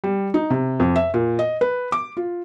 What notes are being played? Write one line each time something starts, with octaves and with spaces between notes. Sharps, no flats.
G3
D#4
C3
F2
E5
A#2
D#5
B4
D6
F4